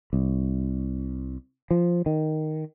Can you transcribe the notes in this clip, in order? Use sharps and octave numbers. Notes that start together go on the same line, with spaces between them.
C2
F3
D#3